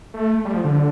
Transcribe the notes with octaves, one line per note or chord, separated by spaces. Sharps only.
A3
G3
F3
D3